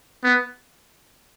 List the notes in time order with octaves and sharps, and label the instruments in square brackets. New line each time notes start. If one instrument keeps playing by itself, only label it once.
[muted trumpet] B3